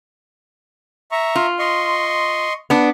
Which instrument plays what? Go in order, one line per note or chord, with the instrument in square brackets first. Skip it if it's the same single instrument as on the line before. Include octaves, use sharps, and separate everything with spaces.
[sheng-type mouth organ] E5 A#5 C#6
[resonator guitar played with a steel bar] F4
[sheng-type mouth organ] D#5 C6 C#6
[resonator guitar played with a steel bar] B3 D4